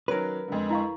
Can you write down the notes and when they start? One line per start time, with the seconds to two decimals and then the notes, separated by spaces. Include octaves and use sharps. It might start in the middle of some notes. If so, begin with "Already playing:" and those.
0.08 D#3 F#3 C#4 A#4 B4
0.48 F2 D3 G#3
0.70 E4 F5 C#6